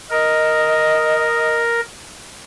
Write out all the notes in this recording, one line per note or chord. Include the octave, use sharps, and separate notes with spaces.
A#4 D#5